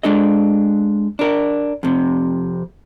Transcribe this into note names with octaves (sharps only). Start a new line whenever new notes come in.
G#3 D4 A4 D#5
D4 A#4
F2 C3